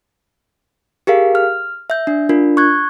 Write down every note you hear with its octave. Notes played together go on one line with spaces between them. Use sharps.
G4 G#4 A#4 F5
F6
E5 G6
D4
D4 F4 A#4
C#6 F#6 G#6